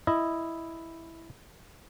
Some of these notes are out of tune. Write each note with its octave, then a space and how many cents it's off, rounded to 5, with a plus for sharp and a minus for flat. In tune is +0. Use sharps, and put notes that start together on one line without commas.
E4 +0 D#5 +0